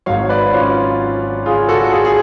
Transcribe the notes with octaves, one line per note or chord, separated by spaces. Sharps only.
G#1 G#2 F#3 C#5 F5
B4 D5
C#4 F4
F4 G#4
F#4 A4
F4 G#4
G#4